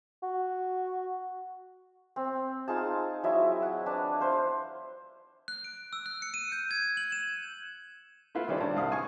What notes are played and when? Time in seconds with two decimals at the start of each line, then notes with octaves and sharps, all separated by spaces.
0.23 F#4
2.16 C4
2.68 D#4 F4 G#4 A5
3.23 F#3 E4 D#5
3.62 F#5
3.86 D4 B4 A5
4.20 B4 C5 F5
5.48 F#6
5.64 D7
5.93 E6
6.06 F#6
6.22 C#7
6.34 D#7
6.52 G6
6.71 G#6
6.97 F#7
7.12 E7
8.35 A3 E4 F4 B4
8.48 D#3 G3 C#4 G4 C5 D5
8.60 G2
8.76 C2 F5 D#6
8.92 G#5 C#6